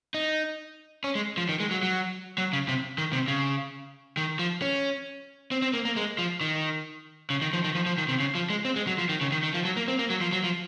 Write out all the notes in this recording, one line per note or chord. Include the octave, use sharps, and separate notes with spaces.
D#4
C#4
G#3
F3
D#3
G#3
F#3
F#3
F#3
C#3
C3
D#3
C3
C#3
D#3
F3
C#4
C4
C4
A#3
A#3
G#3
F3
D#3
C#3
D#3
F3
D#3
F3
F3
D#3
C3
C#3
F3
G#3
C4
G#3
F#3
F3
D#3
C#3
D#3
D#3
F3
F#3
A#3
C4
A#3
F#3
F3
F#3
F3